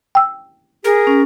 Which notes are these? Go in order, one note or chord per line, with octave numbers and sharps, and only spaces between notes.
G5 E6
G#4 A#4
C#4